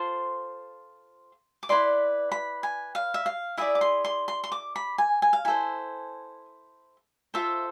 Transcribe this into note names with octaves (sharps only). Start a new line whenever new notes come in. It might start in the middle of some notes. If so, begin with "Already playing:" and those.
Already playing: F4 A4 C5 C6
D6
E4 B4 D5 C6
B5
G#5
F5
E5
F5
E4 G#4 D5 E5
D6
C6
C6
C6
C6
D6
B5
G#5
G#5
F5
E4 A4 C5 G#5
F4 A4 C5 E5